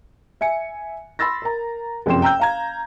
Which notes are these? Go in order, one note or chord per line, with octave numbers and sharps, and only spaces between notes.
E5 G#5 C#7
B5 C6 E6 A6 A#6
A#4 A#5
F#1 F2 C3 G5 C6 E7
G5 A#5 E6 G6
F5 A#5 G#6